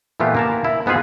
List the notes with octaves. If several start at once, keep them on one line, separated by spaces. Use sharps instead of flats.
A#2 E3 A3 B3 F4 G4
A#3 A#4 A5
E4
G#2 B3 D#4 F4 G#4